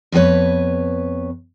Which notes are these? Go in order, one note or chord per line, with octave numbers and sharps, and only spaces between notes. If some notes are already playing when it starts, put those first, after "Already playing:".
F2 B3 F#4 B4 C#5